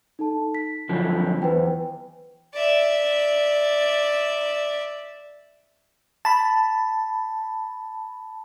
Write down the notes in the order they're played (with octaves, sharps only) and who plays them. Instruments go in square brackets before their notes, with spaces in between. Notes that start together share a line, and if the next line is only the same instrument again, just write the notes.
[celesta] D#4 A4 A5
B6
[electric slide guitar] F#2 D3 F3
[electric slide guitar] E2 [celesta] B4 C5 G5
[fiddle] D5 E5
[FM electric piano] A5 B5